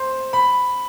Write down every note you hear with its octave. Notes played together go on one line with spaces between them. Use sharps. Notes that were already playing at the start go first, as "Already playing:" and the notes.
Already playing: C5 C6
B5